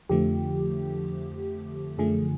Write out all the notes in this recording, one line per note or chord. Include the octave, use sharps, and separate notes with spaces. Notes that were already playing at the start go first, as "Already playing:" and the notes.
F2 D3 F3 A3 G4
F#2 D3 F3 A3 G#4